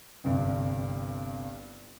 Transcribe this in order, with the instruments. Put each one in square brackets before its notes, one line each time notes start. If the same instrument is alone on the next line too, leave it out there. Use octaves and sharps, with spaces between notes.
[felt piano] G1 C2 G2